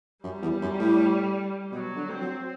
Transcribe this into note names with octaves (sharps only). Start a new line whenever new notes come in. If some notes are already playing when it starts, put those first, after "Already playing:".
F#2 G3
E2
F#2
A2
B2 F#3
D3
C4
F#3